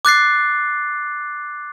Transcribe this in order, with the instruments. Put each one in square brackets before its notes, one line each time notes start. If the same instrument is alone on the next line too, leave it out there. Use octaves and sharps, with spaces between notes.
[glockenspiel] D6 F#6 A6 C7